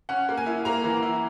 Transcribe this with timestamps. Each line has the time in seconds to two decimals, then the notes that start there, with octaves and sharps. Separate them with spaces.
0.09 C#4 F#5
0.29 A#3
0.37 G#5
0.46 E4
0.65 A#3 A#5
0.84 E3
1.03 E4